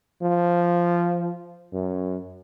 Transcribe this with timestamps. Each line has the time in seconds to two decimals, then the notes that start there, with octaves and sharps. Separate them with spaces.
0.22 F3
1.73 F#2